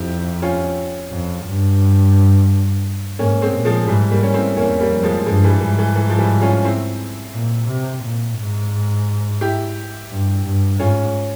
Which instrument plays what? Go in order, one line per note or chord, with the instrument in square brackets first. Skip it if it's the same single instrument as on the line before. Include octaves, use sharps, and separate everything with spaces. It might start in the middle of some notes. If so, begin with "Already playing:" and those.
Already playing: [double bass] F2 [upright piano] E4 G4
[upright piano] C#4 F4
[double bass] F2
G2
[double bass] G#2 [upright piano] A#3 C#4
[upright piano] G#3 C4
[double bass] A#2
[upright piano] F3 G#3
[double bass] G#2 [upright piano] E3 G3
[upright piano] G3 A#3
C#4
C4 E4
[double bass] E2 [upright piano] A#3 C#4
[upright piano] G3 A#3
[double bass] F2
[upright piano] F3 G#3
[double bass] G2 [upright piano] F3 G#3
[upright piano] E3 G3
[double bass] G#2 [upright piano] E3
[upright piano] E3
E3
F3
E3 G3
C#4 F4
C4 E4
[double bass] A#2
C3
A#2
G#2
[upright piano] E4 G4
[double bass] G2
G2
[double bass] G#2 [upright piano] C#4 F4